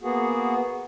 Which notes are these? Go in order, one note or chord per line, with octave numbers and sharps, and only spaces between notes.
A#3 B3 F#4 G#4